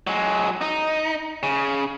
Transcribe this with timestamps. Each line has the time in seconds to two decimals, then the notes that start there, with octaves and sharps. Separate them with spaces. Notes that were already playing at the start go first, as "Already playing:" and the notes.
0.07 F#3 G#3
0.62 D#4
1.43 C#3